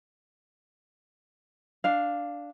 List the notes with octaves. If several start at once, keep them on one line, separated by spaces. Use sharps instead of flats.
D4 F5